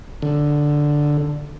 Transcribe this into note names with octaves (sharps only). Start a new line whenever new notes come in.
D3